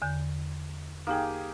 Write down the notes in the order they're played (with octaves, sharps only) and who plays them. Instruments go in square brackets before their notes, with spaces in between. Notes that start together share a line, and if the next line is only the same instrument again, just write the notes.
[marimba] E2 D3 G6
[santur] A#3 G4 G#4 [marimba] D#4 G5